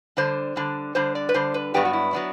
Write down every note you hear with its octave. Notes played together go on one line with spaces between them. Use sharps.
D3 G3 D4 C5
D3 G3 D4
D3 G3 D4 C5
D5
B4
D3 G3 D4 C5
B4
G2 F#3 B3 D4 G4
F#4
E4
F#3 B3 D4